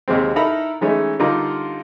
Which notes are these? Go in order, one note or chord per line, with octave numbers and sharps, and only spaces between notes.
D#2 C3 G#3 C4
D#4 E4 A4 A#4 A#5 B5
E3 G#3 A3 C#4 D#4
D3 G3 D#4 F4 A#4